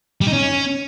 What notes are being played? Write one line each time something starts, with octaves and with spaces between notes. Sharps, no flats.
G3
D#4
C#4